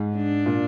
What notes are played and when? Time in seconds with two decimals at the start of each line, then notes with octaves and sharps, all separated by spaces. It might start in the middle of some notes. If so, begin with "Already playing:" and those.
Already playing: G#2
0.16 D4
0.46 A#2